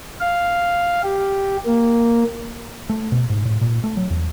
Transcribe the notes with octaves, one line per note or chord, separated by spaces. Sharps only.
F5
G4
A#3
A3
B2
G#2
A2
A#2
A3
F#3
E2